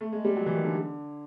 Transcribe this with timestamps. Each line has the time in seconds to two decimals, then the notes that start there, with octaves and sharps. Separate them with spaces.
0.01 A3
0.13 G#3
0.25 G3
0.36 F#3
0.46 E3
0.55 D#3
0.64 D3